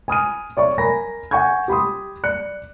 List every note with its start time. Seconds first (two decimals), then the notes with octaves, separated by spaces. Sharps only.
0.08 G#5 D#6 F6 D#7
0.57 C#5 D5 E5 C#6
0.78 A#4 G#5 A#5 B5 A#6
1.31 F#5 G#5 C#6 G6 G#6
1.68 G4 B5 C6 D#6
2.23 D5 F#6 C#7